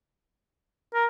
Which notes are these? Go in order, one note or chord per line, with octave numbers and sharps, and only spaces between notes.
A#4